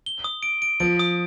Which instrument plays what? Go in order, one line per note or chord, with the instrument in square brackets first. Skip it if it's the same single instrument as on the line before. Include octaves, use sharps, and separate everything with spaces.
[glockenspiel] G7
D#6
D7
D7
[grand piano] F3 [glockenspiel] D7
[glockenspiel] D#6